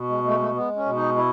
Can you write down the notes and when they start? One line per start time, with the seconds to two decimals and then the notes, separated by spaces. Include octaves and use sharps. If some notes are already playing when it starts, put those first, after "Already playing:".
Already playing: B2
0.09 G#3
0.24 G#3 A3
0.40 A3
0.55 G#3 B3
0.76 C#4
0.86 B2
0.96 D#4
1.16 E4